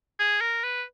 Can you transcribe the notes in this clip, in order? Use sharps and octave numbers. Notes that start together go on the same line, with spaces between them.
G#4
A#4
B4